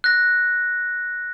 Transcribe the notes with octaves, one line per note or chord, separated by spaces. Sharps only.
F#6 A#6